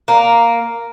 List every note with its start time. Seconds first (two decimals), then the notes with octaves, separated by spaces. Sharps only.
0.08 A#3